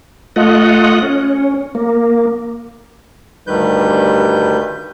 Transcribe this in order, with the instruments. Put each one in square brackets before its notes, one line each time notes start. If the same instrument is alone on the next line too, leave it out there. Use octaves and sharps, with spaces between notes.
[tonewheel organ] A3 F4 D#5 F#5
C#4
A#3
[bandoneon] D2 G2 D#3 G3 B4 G6